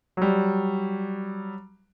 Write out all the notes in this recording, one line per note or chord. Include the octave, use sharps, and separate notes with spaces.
F#3 G3